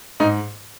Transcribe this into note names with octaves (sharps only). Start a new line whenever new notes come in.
G#2 D#4